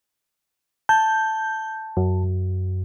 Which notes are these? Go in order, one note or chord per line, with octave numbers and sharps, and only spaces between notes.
A5 G6
F#2